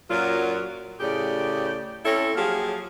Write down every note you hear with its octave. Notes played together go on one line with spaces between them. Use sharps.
F#2 A#2 F#3 F4 A#4
A2 C#3 G4 G#4 D5
C4 C#4 E4 A4
F3 F#3 A#3 G4 G#4